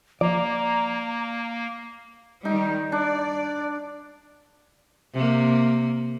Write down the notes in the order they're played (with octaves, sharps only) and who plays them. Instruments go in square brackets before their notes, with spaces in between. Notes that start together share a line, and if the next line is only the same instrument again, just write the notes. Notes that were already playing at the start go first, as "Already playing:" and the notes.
[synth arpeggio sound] F3 [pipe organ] A#3 [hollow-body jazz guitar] D5 [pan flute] A#5
[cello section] D#3 G3 [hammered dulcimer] D#4
[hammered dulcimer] D4 [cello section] D5
[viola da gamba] C3 A#3